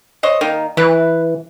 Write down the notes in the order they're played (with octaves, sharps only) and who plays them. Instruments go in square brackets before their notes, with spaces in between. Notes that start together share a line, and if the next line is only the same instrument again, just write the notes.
[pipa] C5 C#5 D#5
D#3 A#3 D#4
[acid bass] E3 [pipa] E4 B4